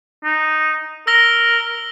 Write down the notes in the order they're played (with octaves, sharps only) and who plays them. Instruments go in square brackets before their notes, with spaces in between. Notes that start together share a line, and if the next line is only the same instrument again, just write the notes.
[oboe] D#4
[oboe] A#4 [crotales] E6 A#6 G7